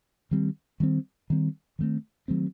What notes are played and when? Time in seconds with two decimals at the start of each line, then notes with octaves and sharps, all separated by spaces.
0.31 D#3 G3 C4
0.80 D#3 G3 C4
1.30 D#3 G3 C4
1.79 D#3 F#3 A3 C4
2.28 D#3 F#3 A3 C4